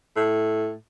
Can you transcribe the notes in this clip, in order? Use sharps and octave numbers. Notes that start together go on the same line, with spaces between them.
A2